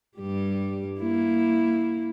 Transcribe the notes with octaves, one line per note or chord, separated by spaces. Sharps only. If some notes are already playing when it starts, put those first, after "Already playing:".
G2 G3 G4
A#3 E4